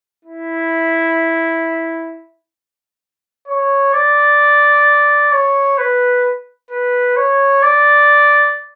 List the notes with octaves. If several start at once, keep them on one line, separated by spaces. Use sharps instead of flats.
E4
C#5
D5
C#5
B4
B4
C#5
D5